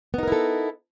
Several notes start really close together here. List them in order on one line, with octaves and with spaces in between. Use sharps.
B3 D#4 A#4 E4 A4